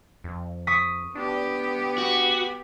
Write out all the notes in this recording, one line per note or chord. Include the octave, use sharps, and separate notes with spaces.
F2
C#6 D#6 B6
B3 D4 G4
F#4